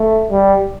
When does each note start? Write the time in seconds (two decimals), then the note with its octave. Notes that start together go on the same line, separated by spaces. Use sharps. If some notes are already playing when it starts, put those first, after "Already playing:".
Already playing: A3
0.31 G3